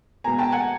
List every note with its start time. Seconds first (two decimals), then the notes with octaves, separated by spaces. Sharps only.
0.24 B2 G#3 B3 G#5 A#5
0.38 G5 A5
0.52 F#5 G#5